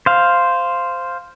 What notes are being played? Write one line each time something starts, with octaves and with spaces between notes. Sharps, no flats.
C5 F5